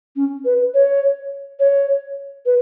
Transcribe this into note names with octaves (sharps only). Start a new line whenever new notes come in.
C#4
B4
C#5
C#5
B4